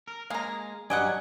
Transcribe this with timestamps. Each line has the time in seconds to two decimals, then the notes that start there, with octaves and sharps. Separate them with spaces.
0.08 A#4
0.30 G#3 A#3 G#4 F5 A#5
0.90 G2 F#3 C#4 D5 D#5 F#5 G#5